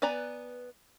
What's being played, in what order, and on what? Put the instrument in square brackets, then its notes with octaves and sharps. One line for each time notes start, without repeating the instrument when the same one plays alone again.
[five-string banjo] B3 B4 D5 G#5 A#5